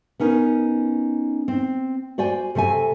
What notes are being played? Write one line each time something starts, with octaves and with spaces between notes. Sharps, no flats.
B3 C#4 D#4 A#4
C4
F#4 C5 D5 G5 G#5
C3 A3 A4 G#5